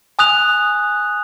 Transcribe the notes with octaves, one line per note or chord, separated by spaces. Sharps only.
G#5 D#6 F#6 F7